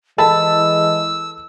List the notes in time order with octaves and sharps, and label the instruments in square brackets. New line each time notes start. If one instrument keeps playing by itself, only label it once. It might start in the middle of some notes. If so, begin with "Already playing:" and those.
[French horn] E3 [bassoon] G#3 [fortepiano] A4 A5 B5 [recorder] E6